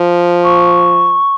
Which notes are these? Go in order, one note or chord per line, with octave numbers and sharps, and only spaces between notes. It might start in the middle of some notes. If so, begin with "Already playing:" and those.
Already playing: F3
C#6